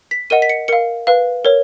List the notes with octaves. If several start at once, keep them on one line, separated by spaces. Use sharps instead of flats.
B6
A#4 D#5 F#5 D#7
B6
C#7
A#4 F5 C#7
B4 F5
A#4 C#5